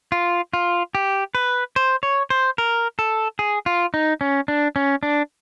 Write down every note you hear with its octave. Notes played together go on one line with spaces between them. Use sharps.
F4
F4
G4
B4
C5
C#5
C5
A#4
A4
G#4
F4
D#4
C#4
D4
C#4
D4